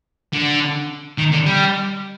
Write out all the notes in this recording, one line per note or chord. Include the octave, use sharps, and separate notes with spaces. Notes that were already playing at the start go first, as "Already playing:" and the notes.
D3
D#3
D3
G3